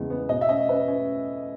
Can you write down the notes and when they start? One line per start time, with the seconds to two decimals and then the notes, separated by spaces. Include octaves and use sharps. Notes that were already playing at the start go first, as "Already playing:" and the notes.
Already playing: E2 C#3 G#3 B3
0.10 B3
0.29 B2 D#5
0.41 E5
0.49 C#4 D#5
0.68 C#4 B4
0.88 C#4